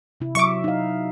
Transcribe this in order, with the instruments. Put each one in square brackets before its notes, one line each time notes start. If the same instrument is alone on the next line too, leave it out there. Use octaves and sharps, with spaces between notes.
[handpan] C3 E4
[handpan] F#3 E5 [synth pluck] C#6 D6
[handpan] D#4 F5